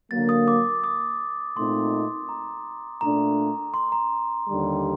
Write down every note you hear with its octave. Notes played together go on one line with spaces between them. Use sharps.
D3 F#3 A#3 A6
D#6
D6
D#6
A#2 A3 C4 D#4 C6
A#5
A#2 A3 D4 A#5
C6
A#5
D#2 D3 G3